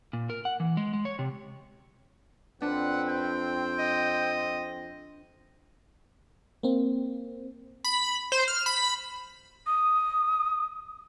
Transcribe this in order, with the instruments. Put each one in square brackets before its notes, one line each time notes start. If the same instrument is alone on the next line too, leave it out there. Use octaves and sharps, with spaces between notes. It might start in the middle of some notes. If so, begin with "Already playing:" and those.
[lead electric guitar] A#2
A#4
F#5
E3
G#3
G#3
C#5
C3
[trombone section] F2 C4 [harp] D4 [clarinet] B4 [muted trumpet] F#5
[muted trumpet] G5
[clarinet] D#5
[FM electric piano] A#3 C4
[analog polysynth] B5
C5
F6
B5
[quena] D#6